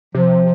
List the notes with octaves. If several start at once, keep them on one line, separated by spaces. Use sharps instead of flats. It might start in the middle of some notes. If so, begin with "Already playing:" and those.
C3 F3